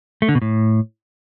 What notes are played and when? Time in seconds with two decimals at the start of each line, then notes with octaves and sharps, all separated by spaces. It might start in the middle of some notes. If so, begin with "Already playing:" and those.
0.22 A3
0.29 D3
0.35 B2
0.42 A2